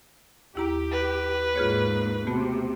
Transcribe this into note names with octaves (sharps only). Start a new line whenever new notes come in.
D#2 E4 G4 A#5
B4
G#2 A#3 F4 G#4 C#5
C3 A3 B3 F#4